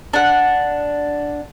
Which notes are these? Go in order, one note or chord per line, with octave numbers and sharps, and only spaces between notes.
D4 F#5